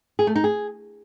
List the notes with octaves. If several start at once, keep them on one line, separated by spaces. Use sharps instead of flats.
G#4
A3
D#4
G#4